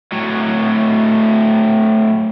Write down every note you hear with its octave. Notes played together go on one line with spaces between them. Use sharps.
A2 F#3